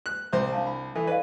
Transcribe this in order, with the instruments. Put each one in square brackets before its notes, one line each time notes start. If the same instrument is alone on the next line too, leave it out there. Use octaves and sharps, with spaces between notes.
[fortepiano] F#6
[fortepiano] C2 C5 [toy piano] E5
[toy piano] D4 F5 A5
B5
[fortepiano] E3 [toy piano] A4
[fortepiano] B4 [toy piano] D5 D#5 F5